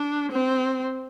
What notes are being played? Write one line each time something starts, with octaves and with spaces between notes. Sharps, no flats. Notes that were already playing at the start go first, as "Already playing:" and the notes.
Already playing: D4
C4